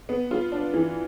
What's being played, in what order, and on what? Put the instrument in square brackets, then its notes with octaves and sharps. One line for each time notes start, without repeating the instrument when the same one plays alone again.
[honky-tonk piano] B3
F4
D4
E3